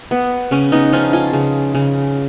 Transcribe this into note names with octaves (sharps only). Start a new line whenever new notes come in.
B3
C#3 C#4
B3 D#4
F3 C#4 F4
F4 G#4
C#3
C#3